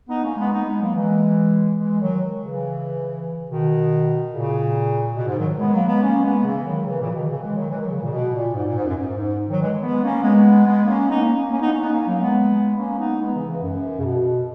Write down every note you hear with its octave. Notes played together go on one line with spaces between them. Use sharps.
B3 D#4
A#3 C#4
G#3 B3
B3 D#4
G#3 B3
F#3 A#3
E3 G#3
E3 G#3
D#3 F#3
C#3 E3
B2 D#3
A#2 C#3
B2
G#2
D#3 F#3
G#3 B3
F#3 A#3
G#3 B3
A#3 C#4
G#3 B3
C#3 E3
D#3 F#3
C#3 E3
A#2 C#3
E3
B2 D#3
C#3 E3
E3 G#3
D#3 F#3
E3 G#3
D#3 F#3
C#3 E3
A#2 C#3
B2
A#2
G#2
A#2
G#2
F#2
G#2
G#2
D#3 F#3
E3 G#3
G#3 B3
A#3 C#4
G#3 B3
G#3 B3
A#3 C#4
B3 D#4
A#3 C#4
A#3 C#4
B3 D#4
A#3 C#4
B3 D#4
A#3 C#4
F#3 A#3
G#3 B3
A#3 C#4
B3 D#4
G#3 B3
C#3 E3
C#3 E3
F#2
C#3
B2